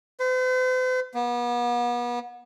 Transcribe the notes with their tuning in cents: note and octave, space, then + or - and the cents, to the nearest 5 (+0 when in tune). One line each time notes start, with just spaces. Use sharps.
C5 -45
B3 -35